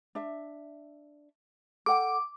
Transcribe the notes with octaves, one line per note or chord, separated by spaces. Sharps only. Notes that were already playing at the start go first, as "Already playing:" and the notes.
D4 E5
A4 F#5 G5 D6